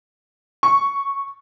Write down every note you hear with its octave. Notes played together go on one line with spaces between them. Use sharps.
C#6